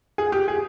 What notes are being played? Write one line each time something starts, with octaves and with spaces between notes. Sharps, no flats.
G#4
G4
G#4